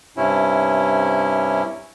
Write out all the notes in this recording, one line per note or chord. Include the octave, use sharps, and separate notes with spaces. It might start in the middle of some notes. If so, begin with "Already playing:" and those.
G2 C3 C#4 E4